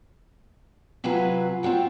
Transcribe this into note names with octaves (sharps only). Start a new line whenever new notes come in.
C3 F#3 F4 F#4 B4 G#5
C4 F4 F#4 G5